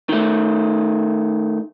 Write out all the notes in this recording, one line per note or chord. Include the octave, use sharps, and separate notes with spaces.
D#3 A3